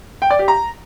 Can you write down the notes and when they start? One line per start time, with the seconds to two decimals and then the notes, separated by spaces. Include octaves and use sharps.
0.22 G5
0.31 D5
0.39 G4
0.48 A#5